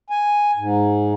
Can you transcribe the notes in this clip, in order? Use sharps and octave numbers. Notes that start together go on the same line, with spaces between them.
G#5
G#2